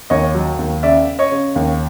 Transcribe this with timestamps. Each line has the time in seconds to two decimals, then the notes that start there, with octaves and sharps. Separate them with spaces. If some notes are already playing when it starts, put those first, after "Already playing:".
0.10 D#2 C#5 D#5
0.35 F#3
0.59 D#2
0.83 C#3 D5 E5
1.07 C#3
1.19 C#5 D#5
1.31 C#3
1.56 D#2